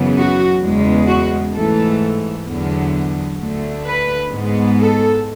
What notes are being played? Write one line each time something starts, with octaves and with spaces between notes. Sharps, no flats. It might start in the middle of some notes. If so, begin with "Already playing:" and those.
Already playing: F#2 C#3 E3 B3
F#4
E2 C#3 G#3 B3
F#4
G#2 E3 A3 A4
E2 D3 F#3 B3
D2 D3 A3
B4
G#2 G#3 B3
A4